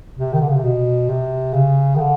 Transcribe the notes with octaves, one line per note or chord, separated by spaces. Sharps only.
C3
D#3
D3
C#3
C3
B2
C3
C#3
D#3
D3